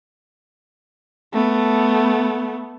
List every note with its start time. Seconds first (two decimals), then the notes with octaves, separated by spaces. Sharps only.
1.33 A3 B3